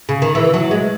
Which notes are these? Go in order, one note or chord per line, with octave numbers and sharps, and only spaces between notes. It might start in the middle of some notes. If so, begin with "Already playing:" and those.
C#3
D#3
E3
F#3
G#3